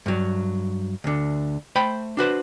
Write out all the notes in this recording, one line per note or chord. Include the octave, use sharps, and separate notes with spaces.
G2 F#3
D2 D3
A3 C5 G5 B5
D4 F#4 B4 C5